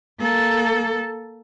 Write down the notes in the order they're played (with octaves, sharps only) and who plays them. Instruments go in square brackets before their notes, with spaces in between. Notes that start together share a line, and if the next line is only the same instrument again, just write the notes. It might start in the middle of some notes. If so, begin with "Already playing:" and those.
[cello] A#3 A4